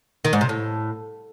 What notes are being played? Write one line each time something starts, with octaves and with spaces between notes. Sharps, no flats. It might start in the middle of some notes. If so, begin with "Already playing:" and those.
D#3
G#2
C3
A2